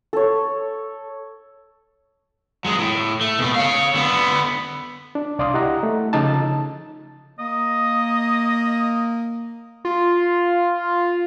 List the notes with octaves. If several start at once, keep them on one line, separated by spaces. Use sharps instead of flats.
A4 C#5
F#3 G#3
A2
A3
B2 A3
C#5 F5
D3 B3
D4
C2 D5 F5 C6 D#6
E4 G4 D#5 F#5 A#5
A3
C#3 F3 D#4 A5
A#3 D#5
F4